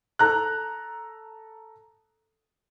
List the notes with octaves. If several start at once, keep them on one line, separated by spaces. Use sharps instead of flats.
A4 A#5 F#6